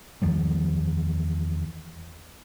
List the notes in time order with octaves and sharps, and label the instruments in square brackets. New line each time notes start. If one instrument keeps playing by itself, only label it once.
[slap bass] E2 D#3 F3 G3